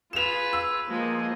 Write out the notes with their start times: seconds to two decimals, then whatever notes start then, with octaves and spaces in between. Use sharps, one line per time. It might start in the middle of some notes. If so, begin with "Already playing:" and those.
0.13 F4 G#4 B4 E7 F7
0.53 E6
0.89 F3 G#3 A#3 D#5